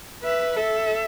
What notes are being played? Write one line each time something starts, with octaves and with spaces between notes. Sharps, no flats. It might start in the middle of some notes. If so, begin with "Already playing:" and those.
B4 E5
A4 E5